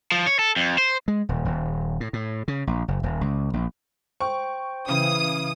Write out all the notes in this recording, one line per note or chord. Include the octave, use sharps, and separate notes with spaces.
F3
C#5
A4
F2
C5
G#3
D#1
D#1
A2
A2
C#3
A#1
F#1
D#1
C#2
A#1
C5 G5 C#6
C#3 E3 D#6